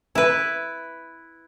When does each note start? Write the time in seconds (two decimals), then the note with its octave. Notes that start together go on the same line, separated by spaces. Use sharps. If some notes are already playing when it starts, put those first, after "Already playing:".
0.15 E4 B4